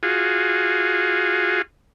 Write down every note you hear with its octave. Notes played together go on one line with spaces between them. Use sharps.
F4 F#4 G#4